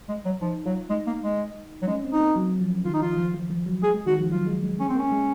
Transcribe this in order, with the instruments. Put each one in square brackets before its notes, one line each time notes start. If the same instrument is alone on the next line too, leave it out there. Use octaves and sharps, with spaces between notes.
[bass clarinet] G#3
F#3
[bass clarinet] F3 [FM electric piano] D#4
[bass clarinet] F#3 [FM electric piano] F4
[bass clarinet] G#3 [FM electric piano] D#4
[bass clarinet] A#3
G#3
F#3
[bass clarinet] G#3 [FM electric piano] C#4
[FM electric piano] C4
[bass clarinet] D#4
[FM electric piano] A#3
F#3
F3
[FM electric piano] D#3 [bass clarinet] F4
[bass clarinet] D#4
[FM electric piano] F3 [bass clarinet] F4
[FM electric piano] F3
F3
F3
F#3
[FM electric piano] G#3 [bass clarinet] G#4
[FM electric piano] G#3
[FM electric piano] D#3 [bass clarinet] F#4
[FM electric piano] F3
[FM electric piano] F#3 [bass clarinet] F4
[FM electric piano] G#3
G#3
[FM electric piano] G#3 [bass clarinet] C#4
[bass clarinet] C4
[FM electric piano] A#3 [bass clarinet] C#4
[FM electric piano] G#3